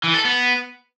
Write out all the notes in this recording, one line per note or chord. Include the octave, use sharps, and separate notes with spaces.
E3
A4
B3